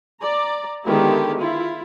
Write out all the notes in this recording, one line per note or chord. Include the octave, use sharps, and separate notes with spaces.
D5 A#5
D3 D#3 G#3 B3 E4 G4
E4 F4